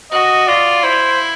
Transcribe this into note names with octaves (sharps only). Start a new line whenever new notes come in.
F#4 D#5
F4 D5
E4 C5